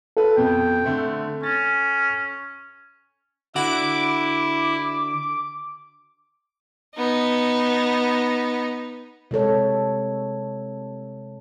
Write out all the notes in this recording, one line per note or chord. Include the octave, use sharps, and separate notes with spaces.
F4 A4 B4
F2 B2 G5
D3 A3 C4
C#4 A6
D3 E4 F#4 F#5 D6
B3 D#4
C3 G#3 A4 C#5